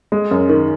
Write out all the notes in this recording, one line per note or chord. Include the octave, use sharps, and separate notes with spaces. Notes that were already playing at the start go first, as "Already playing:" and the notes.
G#3
F#2
D#3